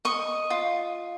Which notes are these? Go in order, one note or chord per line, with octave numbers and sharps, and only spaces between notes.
D#5 C#6
F4